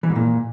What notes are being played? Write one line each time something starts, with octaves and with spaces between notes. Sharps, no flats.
E3
G#2
A#2